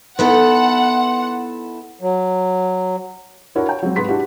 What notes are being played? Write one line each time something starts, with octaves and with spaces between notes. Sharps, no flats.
B3 D#4 E4 A4 F#5 C6
F#3
D4 E4 F#4 A#4 C#5
C#5 G5
F#3 G#3 C4
G#2 G#3 G#4 B4 C6 B6
D4 E4 F#4 G4